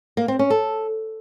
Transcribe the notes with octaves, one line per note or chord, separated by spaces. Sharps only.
A#3
C4
C#4
A4